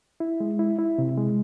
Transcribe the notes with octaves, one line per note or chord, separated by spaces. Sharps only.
E4
G#3
E4
E4
C3
G#3